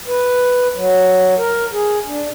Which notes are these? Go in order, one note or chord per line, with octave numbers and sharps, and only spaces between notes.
B4
F#3
A#4
G#4
D4